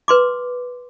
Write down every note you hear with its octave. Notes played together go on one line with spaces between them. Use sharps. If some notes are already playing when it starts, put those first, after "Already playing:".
B4 C6 D6